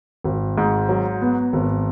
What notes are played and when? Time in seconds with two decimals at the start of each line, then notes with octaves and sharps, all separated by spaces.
0.24 G#1
0.58 G#2
0.89 F#3
1.21 B3
1.53 G#1